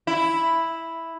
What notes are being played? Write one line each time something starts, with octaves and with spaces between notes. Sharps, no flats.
E4